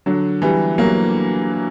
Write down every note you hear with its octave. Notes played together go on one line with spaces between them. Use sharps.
D3 F#3
E3 G3
F#3 A#3